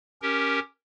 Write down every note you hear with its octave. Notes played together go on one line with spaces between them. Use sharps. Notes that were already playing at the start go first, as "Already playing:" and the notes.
C#4 G4 A#4